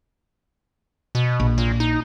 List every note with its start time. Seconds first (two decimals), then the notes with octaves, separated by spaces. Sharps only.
1.15 B2
1.40 A#1
1.58 A#2
1.80 D#4